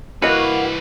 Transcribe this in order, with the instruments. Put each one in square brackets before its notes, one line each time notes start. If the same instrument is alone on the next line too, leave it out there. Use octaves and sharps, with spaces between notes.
[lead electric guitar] C2 B4 [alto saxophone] A#3 [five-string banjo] E4 D#5 [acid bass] F#4